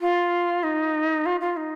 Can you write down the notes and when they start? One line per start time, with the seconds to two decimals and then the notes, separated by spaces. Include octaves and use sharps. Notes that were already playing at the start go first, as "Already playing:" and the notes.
0.01 F4
0.63 D#4
1.26 F4
1.40 F4
1.57 D#4